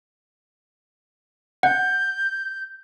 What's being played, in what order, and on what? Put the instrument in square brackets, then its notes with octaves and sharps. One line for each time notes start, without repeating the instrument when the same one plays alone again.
[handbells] F#5 [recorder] G6